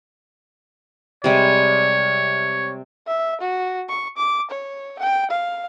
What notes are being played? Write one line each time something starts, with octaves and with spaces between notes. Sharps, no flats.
C3 G3 G#3 C#5
E5
F#4
C#6
D6
C#5
G5
F5